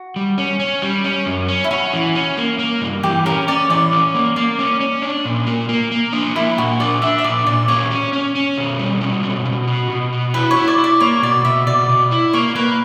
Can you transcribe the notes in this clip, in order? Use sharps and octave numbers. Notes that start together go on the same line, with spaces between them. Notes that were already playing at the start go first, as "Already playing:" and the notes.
Already playing: F#4
G3
C#4
C#4
G3
C#4
F#2
C#4
E4
C#4 F#4
E3
C#4
A#3
A#3
G2
E3 G4
C#4 A#4
C#4 D5
E3 D5
C#4
A#3
A#3 D5
C#4
C#4
D4
A#2
A#3
A#3
A#3
D4
A#3 E4
A#2 F#4
D4 D5
D4 E5
E5
A#2 D5
A#2 D5
C#4 C#5
C#4
C#4
C#4
B2
G3
C#4
B2
B2
F#4
B2
F#4
E4 B4
C#5
E4
D5
E4
D5
A#3 C#5
B2 D5
B2 E5
B2 D5
B2
E4
A#3 C#5
A#3 B4